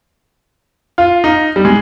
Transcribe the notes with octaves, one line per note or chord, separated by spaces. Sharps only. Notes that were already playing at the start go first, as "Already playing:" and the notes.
F4
D#4
G3
G#3